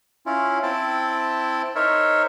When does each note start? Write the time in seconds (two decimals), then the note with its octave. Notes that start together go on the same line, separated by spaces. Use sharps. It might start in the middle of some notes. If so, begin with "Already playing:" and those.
0.26 C#4 E4 F4
0.63 C4 E4 G5 A5
1.75 D#4 A#4 C5 C#5 E5